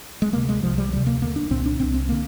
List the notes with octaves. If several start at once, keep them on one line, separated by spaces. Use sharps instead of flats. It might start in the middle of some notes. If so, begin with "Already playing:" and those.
G#3
D2 C3 A#3
G#3
C2 C3 F3
G3
D2 C3 G3
A#3
D#2 D3 A#3
D4
C2 A#2 C4
D4
C2 A#2 C4
C4
D3 A#3